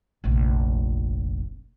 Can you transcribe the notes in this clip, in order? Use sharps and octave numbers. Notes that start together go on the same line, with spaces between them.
F1 A#1